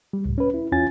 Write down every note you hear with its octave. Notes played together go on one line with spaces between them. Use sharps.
G3
C#2 A2
C#4 B4
E4
E2 C#4 F4 G#5 A6